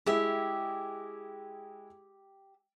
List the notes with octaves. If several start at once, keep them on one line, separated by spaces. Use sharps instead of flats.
G#3 E4 G4 E5